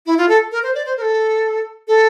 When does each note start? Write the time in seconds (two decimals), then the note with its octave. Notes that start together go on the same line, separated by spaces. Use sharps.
0.06 E4
0.18 F4
0.29 A4
0.52 A#4
0.63 C5
0.75 D5
0.85 C5
0.97 A#4
1.02 A4
1.88 A4